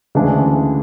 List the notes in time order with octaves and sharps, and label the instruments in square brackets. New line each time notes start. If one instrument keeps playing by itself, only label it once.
[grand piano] D2 C#3 E3 G#3 D4